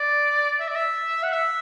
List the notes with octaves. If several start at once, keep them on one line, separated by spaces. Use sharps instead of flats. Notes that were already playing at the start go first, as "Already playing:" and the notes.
Already playing: D5
E5
D5
E5
F#5
E5